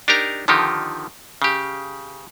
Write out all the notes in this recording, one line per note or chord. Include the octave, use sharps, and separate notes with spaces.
D4 D#4 G4 A#4 A#5
D3 D#3 F3 D#4 G4
C#3 G4